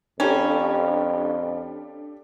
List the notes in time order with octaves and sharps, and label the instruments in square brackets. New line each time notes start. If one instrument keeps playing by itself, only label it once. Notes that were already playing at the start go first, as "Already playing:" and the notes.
[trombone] F2 [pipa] C#4 [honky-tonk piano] D4 G4 A4 [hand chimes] G5 A#5 B5